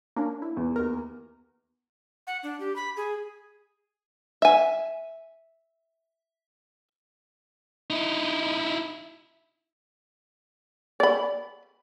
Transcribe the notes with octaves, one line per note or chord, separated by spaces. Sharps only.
A#3 C#4 D4
E4
E2
D#2 A#4
F#5
D4
G4
B5
G#4
E5 G#5
D#4 E4
D5 B5